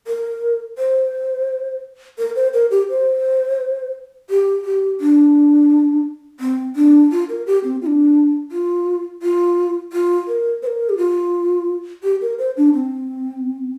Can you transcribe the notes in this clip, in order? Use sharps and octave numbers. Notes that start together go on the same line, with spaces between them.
A#4
C5
A#4
C5
A#4
G4
C5
G4
G4
D4
C4
D4
F4
A#4
G4
C4
F4
D4
F4
F4
F4
A#4
C5
A#4
G4
F4
G4
A#4
C5
D4
C4